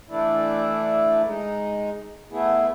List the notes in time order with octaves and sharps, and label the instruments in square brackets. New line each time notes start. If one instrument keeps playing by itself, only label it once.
[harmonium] E3 A3 D4 E4
G#3 D#4
A3 B3 E4 G#4